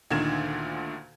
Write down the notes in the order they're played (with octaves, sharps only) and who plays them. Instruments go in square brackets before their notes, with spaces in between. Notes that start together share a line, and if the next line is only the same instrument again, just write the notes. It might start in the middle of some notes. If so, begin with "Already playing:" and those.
[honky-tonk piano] D2 A#2 D3 D#3 G#6 E7